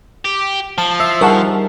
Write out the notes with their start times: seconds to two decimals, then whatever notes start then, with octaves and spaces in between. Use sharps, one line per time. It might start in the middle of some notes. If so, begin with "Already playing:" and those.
0.25 G4
0.78 F3 A5
1.00 E5 E6 C7
1.21 G3 D#4 G#4 A#4 F#5 A5 C#6